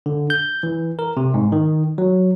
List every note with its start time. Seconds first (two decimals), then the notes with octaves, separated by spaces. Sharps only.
0.06 D3
0.30 G6
0.63 E3
0.99 A#4
1.17 C3
1.34 G#2
1.52 D#3
1.98 F#3